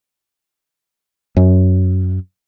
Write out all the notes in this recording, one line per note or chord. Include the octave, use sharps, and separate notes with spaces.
F#2